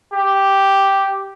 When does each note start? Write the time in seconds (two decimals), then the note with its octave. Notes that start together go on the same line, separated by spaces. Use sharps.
0.14 G4